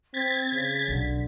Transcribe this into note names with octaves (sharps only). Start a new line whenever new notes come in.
C4 G#6 A6 B6
C#3
B1 D3